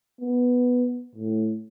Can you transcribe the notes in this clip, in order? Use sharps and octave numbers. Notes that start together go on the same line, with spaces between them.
B3
A2